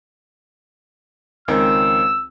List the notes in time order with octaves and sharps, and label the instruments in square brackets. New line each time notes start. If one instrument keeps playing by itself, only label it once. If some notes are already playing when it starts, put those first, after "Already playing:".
[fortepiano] C#2 D#3 C4 [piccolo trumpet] E6